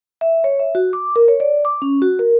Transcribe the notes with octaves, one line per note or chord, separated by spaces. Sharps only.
E5
C#5
E5
F#4
D6
A#4
C#5
D5
D6
C#4
F#4
A#4